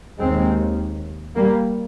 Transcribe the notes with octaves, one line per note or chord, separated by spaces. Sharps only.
D#2 G#3 C4
G3 A#3